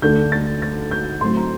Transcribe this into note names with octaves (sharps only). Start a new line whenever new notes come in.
D2 D3 A3 D4 G6
A6
A6
G6
A2 F#3 C4 C6
A#5